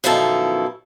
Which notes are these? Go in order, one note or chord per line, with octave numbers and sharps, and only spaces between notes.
F#2 B2 D#3 F3 E4 A4